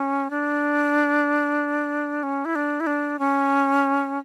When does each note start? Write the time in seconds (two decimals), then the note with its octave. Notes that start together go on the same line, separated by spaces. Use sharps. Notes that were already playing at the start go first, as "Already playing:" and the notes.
Already playing: C#4
0.30 D4
2.23 C#4
2.45 E4
2.55 D4
2.80 E4
2.87 D4
3.19 C#4